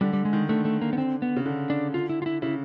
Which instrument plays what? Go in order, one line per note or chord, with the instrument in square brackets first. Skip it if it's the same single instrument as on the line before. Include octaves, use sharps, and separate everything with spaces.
[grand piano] D3 [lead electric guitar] G3
[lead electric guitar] G3
G#3
[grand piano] D#3
[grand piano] D3 [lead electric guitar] A3
[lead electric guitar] A3
A#3
B3
C4
B3
[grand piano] C#3
D3
[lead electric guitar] D4
F4
E4
F4
E4
[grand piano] C#3 [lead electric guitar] E4